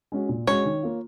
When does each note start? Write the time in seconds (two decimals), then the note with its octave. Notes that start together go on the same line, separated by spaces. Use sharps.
0.12 G#3 C#4 F#4
0.29 A#2
0.47 G#3 C#4 F#4 C#5
0.65 D#3
0.83 A#3 F4